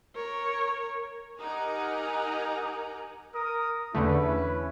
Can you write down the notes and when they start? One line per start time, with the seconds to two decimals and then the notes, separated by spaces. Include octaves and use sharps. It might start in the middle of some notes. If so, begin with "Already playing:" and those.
0.15 A#4 C#5
1.40 D#4 G4 A#4 F#5 G#5 A#5
3.35 A#4 D#6
3.95 E2 D3 A3 C#4 E4 B4